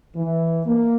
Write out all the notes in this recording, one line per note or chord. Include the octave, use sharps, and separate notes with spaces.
E3
A#3